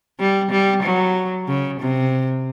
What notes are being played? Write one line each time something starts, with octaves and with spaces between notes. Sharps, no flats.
G3
G3
F#3
C#3
C3